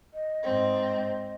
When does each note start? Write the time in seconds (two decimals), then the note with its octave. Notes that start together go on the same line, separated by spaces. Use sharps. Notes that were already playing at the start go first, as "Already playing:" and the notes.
0.13 D#5
0.44 G#2 C4